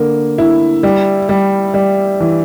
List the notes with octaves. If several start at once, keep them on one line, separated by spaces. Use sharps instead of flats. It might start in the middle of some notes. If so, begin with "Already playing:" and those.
Already playing: D3 A#3
E4
G3
G3
G3
E3